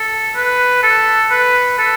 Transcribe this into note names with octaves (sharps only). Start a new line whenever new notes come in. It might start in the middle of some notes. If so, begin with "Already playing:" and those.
Already playing: A4
B4
A4
B4
A4